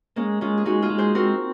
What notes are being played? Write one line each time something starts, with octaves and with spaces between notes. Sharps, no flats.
G#3 A#3 C#4
G#3 C#4 F4
G#4
G#3 D#4 F#4
F4 G#4
G#3
G#4 C5
C4 F#4 A#4